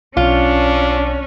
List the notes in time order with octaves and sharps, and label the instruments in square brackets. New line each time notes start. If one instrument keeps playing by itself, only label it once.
[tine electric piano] B1 [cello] C#4 [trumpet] D4 [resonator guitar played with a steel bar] F4